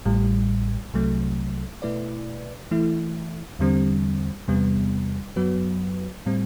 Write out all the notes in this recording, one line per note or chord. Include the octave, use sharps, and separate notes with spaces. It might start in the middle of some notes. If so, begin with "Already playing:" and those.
A1 A2 G3
C2 C3 F#3 A3
B2 A3 E4 B4 D5
E3 A3 E4
E2 D3 G3 C4
E2 C3 G3 B3
F#2 F#3 B3 F#4 B4
A2 G3 C4